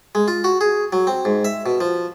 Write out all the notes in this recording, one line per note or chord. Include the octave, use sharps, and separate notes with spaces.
G#3
F4
F#4
G#4
F#3
C4
G#2
E5
B2
F3